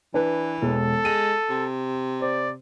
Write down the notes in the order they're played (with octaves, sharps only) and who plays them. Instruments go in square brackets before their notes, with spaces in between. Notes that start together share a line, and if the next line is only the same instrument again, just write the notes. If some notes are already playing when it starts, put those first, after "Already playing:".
[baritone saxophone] E3 [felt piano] D4 B4
[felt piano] E1 G#3 [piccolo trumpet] A4
[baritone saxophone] G#3 [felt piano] D#7
[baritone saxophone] C3
[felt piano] C5 [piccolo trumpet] D5